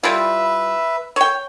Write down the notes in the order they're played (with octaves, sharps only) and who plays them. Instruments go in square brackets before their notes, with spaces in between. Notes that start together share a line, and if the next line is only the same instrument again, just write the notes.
[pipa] G3 E4 F4 [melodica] B4 E5
[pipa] C#5 G5